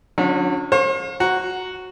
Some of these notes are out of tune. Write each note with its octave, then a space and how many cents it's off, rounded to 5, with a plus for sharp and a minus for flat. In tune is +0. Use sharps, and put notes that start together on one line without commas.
D3 +10 F#3 -40 C#4 +0
C5 +45 F5 +35 C#6 +0
F#4 +0 A#5 +0